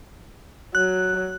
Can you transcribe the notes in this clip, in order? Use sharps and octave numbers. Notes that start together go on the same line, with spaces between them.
F#3 F#6